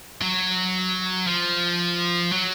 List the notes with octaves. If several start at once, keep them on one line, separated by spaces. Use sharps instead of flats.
F#3
F3
F#3